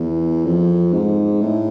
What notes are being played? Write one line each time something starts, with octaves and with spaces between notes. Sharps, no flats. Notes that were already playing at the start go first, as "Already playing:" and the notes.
Already playing: E2
F2
G#2
A2